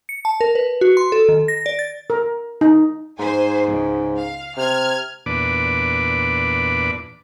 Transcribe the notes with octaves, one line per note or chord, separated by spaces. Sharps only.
C#7
A5
A#4
B4
F#4
C6
A4
D#3
A#6
D5
A6
A#4
D#4
G#2 C5 G#5
C#2
F5
C3 F6 G#6
E2 A#2 D4 B4 D6